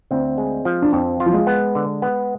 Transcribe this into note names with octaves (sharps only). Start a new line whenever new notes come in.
D2 C4
G#3
F3
D4
F2 C4
F4
F3
G#3
B3
D3
B3